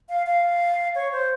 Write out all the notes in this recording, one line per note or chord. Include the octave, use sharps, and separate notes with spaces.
F5
F5
C#5
C5